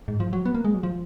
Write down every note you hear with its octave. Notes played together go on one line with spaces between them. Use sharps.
G#2
F3
F#3
B3
A#3
G#3
F#3
F3